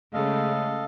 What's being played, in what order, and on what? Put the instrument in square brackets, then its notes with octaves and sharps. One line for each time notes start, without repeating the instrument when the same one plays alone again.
[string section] C#3 G#3 A3 [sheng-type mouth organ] A4 D#5 F5